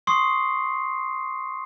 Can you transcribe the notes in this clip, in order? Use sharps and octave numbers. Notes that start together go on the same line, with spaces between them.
C6 C#6 D#6 C7